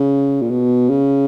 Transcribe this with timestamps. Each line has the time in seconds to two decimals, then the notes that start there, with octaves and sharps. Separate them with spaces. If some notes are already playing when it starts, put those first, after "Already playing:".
Already playing: C#3
0.41 A#2
0.50 B2
0.89 C#3